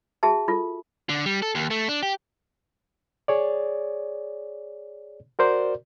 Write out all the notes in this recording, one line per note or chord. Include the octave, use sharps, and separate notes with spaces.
F#4 G#4 E5 A5
F4 A4
D3
G3
A4
D#2
A3
D4
G4
G#4 C#5 D5
F#4 A#4 C5 D5